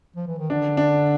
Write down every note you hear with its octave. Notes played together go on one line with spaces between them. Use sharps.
F3
E3
D#3
D3 D4
D4